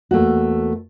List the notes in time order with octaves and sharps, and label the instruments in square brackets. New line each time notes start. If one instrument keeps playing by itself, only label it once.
[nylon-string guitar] E2 A3 A#3 F#4